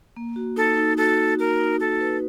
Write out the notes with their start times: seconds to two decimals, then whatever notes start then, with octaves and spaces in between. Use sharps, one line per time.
0.16 A#3
0.36 F#4
0.56 D#4 A4
0.77 D#4
0.97 F#4 A4
1.18 F#4
1.39 F#4 A#4
1.60 D#4
1.80 D#4 A4
2.00 B4